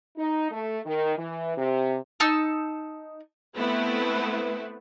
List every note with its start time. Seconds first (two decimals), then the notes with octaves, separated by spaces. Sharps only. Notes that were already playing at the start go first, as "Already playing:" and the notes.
0.17 D#4
0.51 A3
0.86 D#3
1.17 E3
1.57 C3
2.20 D#4 A5 E6
3.57 A3 B3 C4 E4